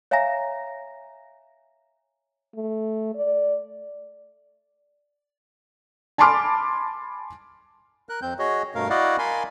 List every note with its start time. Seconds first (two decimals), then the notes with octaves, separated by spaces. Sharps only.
0.11 C#5 E5 F5 G#5 A#5 A#6
2.56 A3
3.15 D5
6.18 G#5 A5 B5 C6 D6 F6
8.09 A#4 F#6
8.22 F2 C4 G6
8.39 F#4 G#4 C#5 D#5
8.75 G2 B2 A3 A#4 F5
8.90 E4 F#4 D5 D#5 F5 F#5
9.18 A#4 F5 G#5 B5 C6